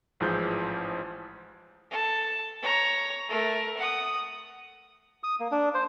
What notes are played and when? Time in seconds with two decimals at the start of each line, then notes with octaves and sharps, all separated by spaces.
0.20 A1 G#2 E3 F3 G#4 G6
1.91 A4 A5
2.62 C#5 A#5
3.29 A3 A#4
3.77 F#5 D#6
5.23 D#6
5.40 A#3
5.51 D4
5.74 C5